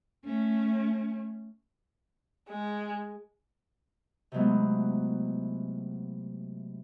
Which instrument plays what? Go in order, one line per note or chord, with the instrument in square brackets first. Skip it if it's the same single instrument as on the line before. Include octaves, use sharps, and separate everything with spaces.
[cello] A3 C#4
[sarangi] G#3
[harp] C3 E3 F#3 G#3 A3 B3